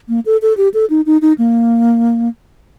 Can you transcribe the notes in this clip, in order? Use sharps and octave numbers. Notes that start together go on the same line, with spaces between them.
A#3
A4
A4
G4
A4
D#4
D#4
D#4
A#3